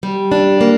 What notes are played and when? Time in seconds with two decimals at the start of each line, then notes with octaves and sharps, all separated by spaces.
0.03 G3
0.32 D4
0.61 A#3